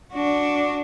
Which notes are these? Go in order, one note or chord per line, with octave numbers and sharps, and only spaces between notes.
D4 F#4